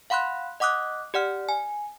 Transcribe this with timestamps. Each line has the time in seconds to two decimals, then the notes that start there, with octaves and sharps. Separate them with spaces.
0.10 F5 F#5 B5 C6 F#6
0.60 D#5 F#5 D6 D#6 F#6
1.14 G4 D5 F#5 F6
1.49 G#5